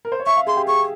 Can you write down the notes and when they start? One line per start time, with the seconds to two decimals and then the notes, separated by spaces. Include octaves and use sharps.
0.05 A#4
0.12 C5
0.20 C#5
0.26 E5 C#6
0.37 F5
0.47 G#4 C6
0.57 G4
0.67 G#4 C#6